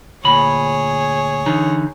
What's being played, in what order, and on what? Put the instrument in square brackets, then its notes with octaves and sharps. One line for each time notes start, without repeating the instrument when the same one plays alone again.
[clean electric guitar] D2 A#2 B5 [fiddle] G#4 C#5
[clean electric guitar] D3 E3 D#4